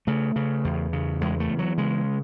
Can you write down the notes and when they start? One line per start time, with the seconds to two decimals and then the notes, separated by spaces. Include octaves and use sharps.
0.07 C#3 A3
0.36 C#3
0.64 E2
0.93 C#3
1.21 E2 G#3
1.40 A3
1.49 E2
1.59 F#3
1.78 C#3 G#3